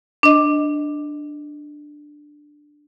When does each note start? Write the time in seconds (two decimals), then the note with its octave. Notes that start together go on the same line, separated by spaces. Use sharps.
0.23 D4 D#5